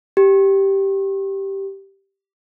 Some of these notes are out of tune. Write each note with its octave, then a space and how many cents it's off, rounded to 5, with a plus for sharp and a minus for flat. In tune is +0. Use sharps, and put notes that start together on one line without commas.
G4 -5